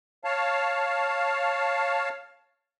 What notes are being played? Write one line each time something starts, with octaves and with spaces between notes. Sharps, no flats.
C#5 F5 A5